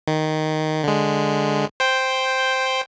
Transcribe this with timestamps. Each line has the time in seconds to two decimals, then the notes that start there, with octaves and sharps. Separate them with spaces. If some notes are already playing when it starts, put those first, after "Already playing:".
0.08 D#3
0.84 D3 G#3
1.80 C5 G5